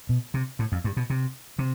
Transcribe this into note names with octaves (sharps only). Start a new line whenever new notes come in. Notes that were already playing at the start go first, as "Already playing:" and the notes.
B2
C3
A2
F2
G2
B2
C3
C3